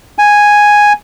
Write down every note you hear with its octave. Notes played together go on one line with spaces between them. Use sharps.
G#5